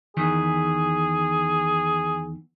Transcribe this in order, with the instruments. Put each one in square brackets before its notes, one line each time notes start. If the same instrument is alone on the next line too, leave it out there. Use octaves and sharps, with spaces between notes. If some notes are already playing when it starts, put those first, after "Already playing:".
[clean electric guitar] E2 D#3 E3 [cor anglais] G#4